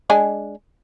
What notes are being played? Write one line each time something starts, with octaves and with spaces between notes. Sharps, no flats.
G#3 D4 G#5